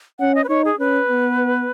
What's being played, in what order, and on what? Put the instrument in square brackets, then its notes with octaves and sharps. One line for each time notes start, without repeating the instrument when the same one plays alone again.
[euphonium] C#4 [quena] F#5
[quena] D#5
B4
[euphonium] D#4 [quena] C#5
[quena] G#4
[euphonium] C#4 [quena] B4
[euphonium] B3